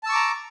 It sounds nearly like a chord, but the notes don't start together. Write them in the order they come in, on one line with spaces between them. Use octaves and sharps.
A5 E6 C#6 D6 A#5